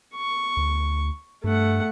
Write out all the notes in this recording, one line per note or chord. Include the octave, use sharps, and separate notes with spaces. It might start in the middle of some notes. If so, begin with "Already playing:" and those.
C#6
D2
G2 A3 F#5